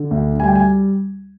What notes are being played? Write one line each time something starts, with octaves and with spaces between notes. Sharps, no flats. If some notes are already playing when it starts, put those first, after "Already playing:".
Already playing: D3
D2
G3 G#5
G5
G#5